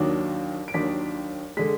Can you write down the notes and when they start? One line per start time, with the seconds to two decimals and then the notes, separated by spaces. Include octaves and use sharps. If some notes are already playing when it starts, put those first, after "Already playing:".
Already playing: D#2 D#3 F#3 D4
0.68 D7
0.74 D#2 D#3 F#3 D4 B6
1.57 D3 G#3 B6